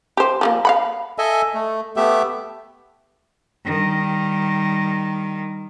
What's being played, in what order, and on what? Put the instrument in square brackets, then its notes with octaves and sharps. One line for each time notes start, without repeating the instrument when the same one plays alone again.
[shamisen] G4 C5
F3 A3 A#3
F5 F#5 B5
[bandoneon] A4 D#5 E5 G#5
A3
A3 B3 G4 E5
[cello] D#3 G3